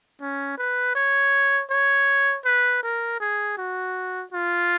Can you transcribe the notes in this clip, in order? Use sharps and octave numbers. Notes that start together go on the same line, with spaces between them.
C#4
B4
C#5
C#5
B4
A#4
G#4
F#4
F4